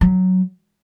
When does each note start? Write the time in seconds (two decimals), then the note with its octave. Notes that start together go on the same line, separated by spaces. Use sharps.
0.01 F#3